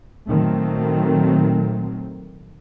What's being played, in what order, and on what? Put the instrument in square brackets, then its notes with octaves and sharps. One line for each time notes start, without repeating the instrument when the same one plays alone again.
[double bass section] A#2 D#3 F#3 A3 C4